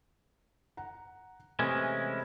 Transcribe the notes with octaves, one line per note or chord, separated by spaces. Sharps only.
F#5 A#5
C3 E3 G#3 A3 C4 C#4